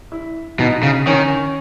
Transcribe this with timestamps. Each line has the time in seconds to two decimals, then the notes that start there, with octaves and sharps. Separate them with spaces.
0.12 E4
0.59 B2 D#4
0.83 C#3
1.07 D#3 C#4